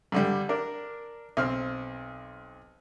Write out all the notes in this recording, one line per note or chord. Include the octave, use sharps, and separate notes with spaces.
G2 D3 G3
D4 A#4
B1 C4 F6